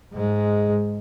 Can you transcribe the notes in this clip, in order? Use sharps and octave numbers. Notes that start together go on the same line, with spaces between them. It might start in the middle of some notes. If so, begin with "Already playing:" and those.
G#2 G#3